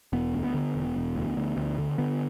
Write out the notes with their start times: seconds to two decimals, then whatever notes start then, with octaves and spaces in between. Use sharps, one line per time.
0.13 E1 B3
0.34 D2
0.44 B3
0.54 D3
0.75 E1
0.96 E1
1.16 D2
1.37 D2
1.57 D2
1.78 D3
1.98 D3 B3